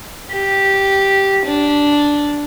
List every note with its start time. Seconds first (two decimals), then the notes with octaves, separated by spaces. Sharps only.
0.31 G4
1.46 D4